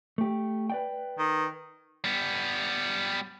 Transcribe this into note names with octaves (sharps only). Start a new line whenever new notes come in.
A3 G4
B4 D5 G5
D#3
G3 B3